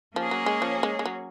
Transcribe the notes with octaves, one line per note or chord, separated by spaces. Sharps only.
F3 A#3 C#4 G#4 C#5
F#3
G#3
F3
G#3
G#3
F#3